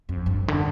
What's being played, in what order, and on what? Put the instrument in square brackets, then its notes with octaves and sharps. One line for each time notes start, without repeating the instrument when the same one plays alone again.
[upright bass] F2
G2
D3